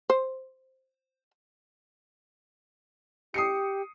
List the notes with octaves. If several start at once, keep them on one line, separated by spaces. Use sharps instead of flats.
C5
G4 D#6 C7 C#7